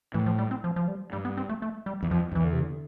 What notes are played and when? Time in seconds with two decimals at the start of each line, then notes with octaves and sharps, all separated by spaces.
0.14 A2 E3
0.26 F3
0.39 G3
0.51 C4
0.64 F3
0.76 F3
0.88 G3
1.12 G2 G3
1.25 B3
1.37 C4
1.49 A3
1.62 A3
1.86 G3
2.02 E2
2.11 F2 F3
2.32 F2
2.35 E2 E3
2.44 D3
2.53 C3
2.61 D3